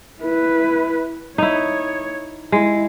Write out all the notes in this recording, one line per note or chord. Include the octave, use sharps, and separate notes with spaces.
E4 B4
D#4 E4 C#5
G#3 E4